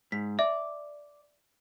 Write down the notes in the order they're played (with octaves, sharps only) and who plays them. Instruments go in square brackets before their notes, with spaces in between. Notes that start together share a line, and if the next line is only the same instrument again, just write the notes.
[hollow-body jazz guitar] G#2 [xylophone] B6
[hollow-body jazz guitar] D5 [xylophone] E5